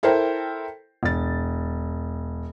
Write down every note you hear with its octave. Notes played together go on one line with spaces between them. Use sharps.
E4 A4 A#4 C5 G5
E1 A6